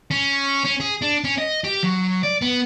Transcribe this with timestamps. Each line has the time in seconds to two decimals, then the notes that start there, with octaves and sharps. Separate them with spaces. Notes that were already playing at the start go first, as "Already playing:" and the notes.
0.11 C#4
0.65 C#4
0.80 G#4
1.02 D4
1.24 C#4
1.38 D#5
1.64 G4
1.83 F#3
2.23 D5
2.42 B3